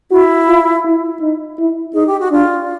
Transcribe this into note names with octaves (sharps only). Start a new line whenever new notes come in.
E4 F#4
F4
E4
D#4
E4
D#4 G#4
G4
F#4
D4 F4